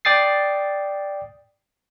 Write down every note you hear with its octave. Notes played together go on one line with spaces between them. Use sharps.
D5 G5 D#6 A6 C7